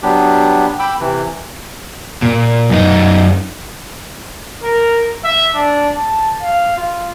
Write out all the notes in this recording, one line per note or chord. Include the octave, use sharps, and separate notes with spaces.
F#3 B3 D4 G4
G5 B5 D6 E6
C3 E3
A#2
F#2 D#4
A#4
E5
D4
A5
F5
F4